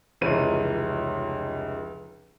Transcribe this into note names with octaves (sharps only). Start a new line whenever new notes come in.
F1 C#2 E3 C#5 D#7